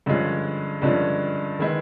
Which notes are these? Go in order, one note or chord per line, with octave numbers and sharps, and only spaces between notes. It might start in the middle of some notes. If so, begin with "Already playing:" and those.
G2 D3 F3 G#3 C#4
G2 D3 F3 G#3 C#4
D#3 G#3 B3 E4